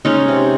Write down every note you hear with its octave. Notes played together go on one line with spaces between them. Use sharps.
G#3 C#4 D#4
C3